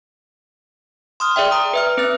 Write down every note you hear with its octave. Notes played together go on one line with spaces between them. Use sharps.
C6 D#6 F6
G#4 D5 E5 G5
A#5 D#6
B4 E5 F6
C4 B4 F#6 A6